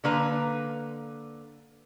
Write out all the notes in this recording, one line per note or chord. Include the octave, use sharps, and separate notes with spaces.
D3 A#3 B4 A#5